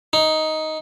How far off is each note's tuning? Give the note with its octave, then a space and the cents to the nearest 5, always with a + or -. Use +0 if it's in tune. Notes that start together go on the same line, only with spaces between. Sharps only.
D#4 +10